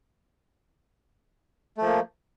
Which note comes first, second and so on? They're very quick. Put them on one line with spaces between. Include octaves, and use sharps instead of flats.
A3 F3 A#3